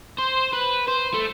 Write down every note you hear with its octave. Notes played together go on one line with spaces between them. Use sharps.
C5
B4
C5
A3